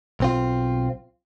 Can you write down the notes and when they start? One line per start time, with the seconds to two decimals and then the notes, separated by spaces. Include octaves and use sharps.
0.20 B1 C4 F4